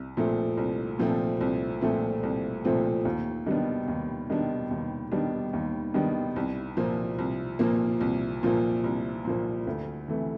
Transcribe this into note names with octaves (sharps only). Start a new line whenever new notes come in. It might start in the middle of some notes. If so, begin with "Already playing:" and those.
Already playing: C2
A#2 F3 A3 C4
C2
A#2 F3 A3 C4
C2
A#2 F3 A3 C4
C2
A#2 F3 A3 C4
D#2
D#3 G3 B3 D4
D#2
D#3 G3 B3 D4
D#2
D#3 G3 B3 D4
D#2
D#3 G3 B3 D4
C2
A#2 F3 A#3
C2
A#2 F3 A#3
C2
A#2 F3 A#3
C2
A#2 F3 A#3
D2
C3 E3 A3